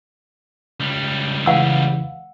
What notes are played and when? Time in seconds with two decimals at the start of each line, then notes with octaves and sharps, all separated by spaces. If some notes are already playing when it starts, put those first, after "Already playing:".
0.80 C#2 G3
1.46 C#3 E3 F5 F#5 E6